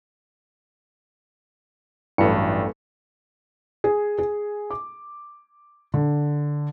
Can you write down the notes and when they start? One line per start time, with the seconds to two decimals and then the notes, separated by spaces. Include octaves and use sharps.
2.18 A1 G2 E3 F#3 A3 C#7
3.84 G#4
4.19 G#4
4.70 D6
5.94 D3